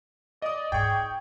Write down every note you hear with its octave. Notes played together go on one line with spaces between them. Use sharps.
D5 D#5 D#6
G#2 G#4 G5 C#6